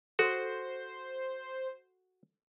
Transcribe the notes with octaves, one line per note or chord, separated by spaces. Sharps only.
F#4 A4 C5